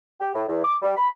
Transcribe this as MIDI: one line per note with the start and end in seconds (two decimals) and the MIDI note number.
0.21 0.31 67
0.35 0.43 45
0.48 0.60 40
0.65 0.76 86
0.82 0.93 55
0.97 1.09 83